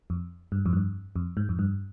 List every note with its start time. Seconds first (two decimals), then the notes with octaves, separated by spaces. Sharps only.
0.10 F2
0.52 G2
0.66 F2
0.73 G2
1.16 F2
1.37 G#2
1.49 F2
1.59 G2